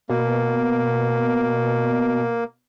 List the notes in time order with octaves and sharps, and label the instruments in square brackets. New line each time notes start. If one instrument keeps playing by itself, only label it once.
[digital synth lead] B2 [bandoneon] A#3